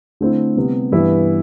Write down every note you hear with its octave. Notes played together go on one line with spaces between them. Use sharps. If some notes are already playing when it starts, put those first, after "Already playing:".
D3 A3 C4 E4
C3 G3 B3
G2 E3 B3 E4 B4